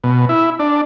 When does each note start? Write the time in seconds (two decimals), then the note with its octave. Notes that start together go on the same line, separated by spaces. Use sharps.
0.04 B2
0.29 E4
0.59 D4